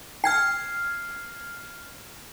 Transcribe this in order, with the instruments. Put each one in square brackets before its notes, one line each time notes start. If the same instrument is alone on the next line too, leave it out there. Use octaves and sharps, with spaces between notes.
[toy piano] G5 [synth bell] F6 G#6 C7